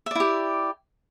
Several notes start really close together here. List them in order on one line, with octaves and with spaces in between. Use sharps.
E5 D5 E4 G4